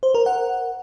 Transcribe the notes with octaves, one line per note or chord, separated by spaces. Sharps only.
C5
A#4
F#5